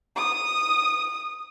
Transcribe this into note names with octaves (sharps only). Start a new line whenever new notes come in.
D#6